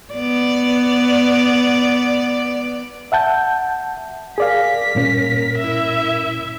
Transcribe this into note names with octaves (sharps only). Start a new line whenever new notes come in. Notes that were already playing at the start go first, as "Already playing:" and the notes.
B3 D5
E5 F#5 A5 G6
G#4 A#4 D5 F5 B6
G2 A#2 C#4
E4 E5